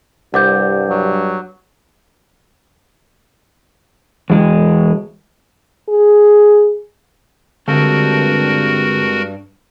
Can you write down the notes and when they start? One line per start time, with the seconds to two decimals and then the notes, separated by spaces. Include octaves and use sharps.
0.34 C2 G2 F#5 D6 G6
0.90 F#3
4.30 E2 G#3
5.89 G#4
7.68 G2 D3 G#3 C4 F#4 A4 A#4